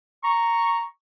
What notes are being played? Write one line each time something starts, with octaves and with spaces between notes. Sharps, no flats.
A#5 C#6